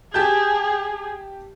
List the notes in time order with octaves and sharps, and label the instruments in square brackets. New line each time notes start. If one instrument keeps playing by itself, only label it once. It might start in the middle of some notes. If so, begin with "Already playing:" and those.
[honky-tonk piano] G4 A5 G6 [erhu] G#4